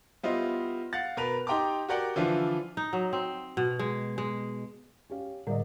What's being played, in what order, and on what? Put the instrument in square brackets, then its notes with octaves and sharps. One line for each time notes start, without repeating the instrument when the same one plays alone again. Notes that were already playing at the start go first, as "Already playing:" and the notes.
[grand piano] G3 B3 E4 F4 C5 D#5
F5 F#5 A6
B2 A#4 B4 F7
D#4 G4 G5 A#5 C6 D6
F#4 G4 A#4 D5 F#5 G5
D3 E3 F3 D4 E4 F4
[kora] D#4
F#3
C4
B2
G#3
G#3
[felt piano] C#4 G4 F5
[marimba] A2 D3 G3 [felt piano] A#4 D5 D#5